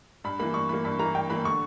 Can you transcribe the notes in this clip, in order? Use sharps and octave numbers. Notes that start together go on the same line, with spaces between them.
G2 B5
E3 A#3 B5
G2 C#6
E3 A#3 B5
G2 B5
E3 A#3 A#5
G2 G5
E3 A#3 B5
D3 C#6